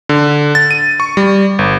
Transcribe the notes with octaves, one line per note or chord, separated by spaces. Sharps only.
D3
A6
D#7
C#6
G3
G1